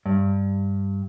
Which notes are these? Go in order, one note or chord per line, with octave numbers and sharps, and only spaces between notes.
G2